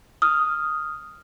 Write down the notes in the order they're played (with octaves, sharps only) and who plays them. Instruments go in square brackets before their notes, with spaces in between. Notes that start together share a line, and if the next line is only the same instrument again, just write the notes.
[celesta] D#6 F6